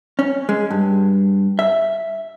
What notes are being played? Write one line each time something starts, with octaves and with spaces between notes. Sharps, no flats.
C#4
G#3
G2
E5